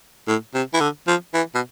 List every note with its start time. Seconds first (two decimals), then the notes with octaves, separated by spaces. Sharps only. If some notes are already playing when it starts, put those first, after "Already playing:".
0.28 A2
0.54 C3
0.74 E3
0.80 D3
1.07 F3
1.34 E3
1.55 B2